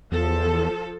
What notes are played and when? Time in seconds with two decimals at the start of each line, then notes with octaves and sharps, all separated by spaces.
0.12 E2 F3 A4